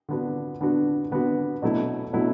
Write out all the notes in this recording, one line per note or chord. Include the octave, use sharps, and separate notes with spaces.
D3 B3 D4 F#4
D3 B3 D4 F#4
D3 B3 D4 F#4
B2 F#3 A3 E4
B2 F#3 A3 E4